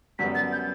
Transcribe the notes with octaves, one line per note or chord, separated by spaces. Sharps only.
F#2 D3 G3 B3 B6
A6
G6